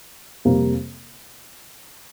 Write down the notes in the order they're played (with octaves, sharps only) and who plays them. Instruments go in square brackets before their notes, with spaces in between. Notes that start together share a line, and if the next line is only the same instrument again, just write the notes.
[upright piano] F2 C3 G3 A#3